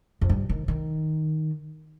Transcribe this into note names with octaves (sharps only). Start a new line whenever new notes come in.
F2
G2
D#3
D#3